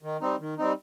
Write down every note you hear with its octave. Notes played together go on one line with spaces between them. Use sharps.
D#3
G3 C4 D#4
D#3
G3 C4 D#4